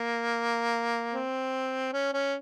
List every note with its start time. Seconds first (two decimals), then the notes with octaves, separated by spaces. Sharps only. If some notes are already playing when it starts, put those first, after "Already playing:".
Already playing: A#3
1.14 C4
1.93 C#4
2.14 C#4